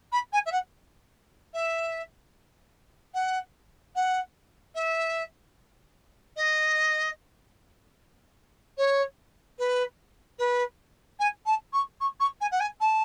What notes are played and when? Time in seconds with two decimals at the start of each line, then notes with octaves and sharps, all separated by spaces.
0.12 B5
0.33 G#5
0.46 E5
0.52 F#5
1.54 E5
3.14 F#5
3.96 F#5
4.75 E5
6.37 D#5
8.78 C#5
9.59 B4
10.39 B4
11.20 G#5
11.46 A5
11.73 C#6
12.01 C#6
12.20 C#6
12.41 G#5
12.51 F#5
12.60 G#5
12.81 A5